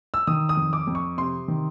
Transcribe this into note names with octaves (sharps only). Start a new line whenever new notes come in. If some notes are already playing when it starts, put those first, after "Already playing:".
E6
D#3 D#6
D#6
F2
D6
F2
C#6
C3 C6
D#3